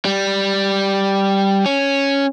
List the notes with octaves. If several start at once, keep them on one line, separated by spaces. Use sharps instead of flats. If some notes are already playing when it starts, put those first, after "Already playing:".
G3
C#4